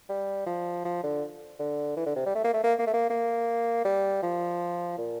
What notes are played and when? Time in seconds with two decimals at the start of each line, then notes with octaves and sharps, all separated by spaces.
0.09 G3
0.46 F3
0.85 F3
1.03 D3
1.59 D3
1.97 E3
2.06 D3
2.16 C3
2.26 G3
2.35 A3
2.44 A#3
2.53 A3
2.64 A#3
2.79 A#3
2.87 A3
2.94 A#3
3.10 A#3
3.85 G3
4.22 F3
4.98 A#2